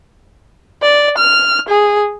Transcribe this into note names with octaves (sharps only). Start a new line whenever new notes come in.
D5
F6
G#4